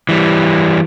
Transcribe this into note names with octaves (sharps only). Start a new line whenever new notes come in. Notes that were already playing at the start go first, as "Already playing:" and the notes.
E3 G3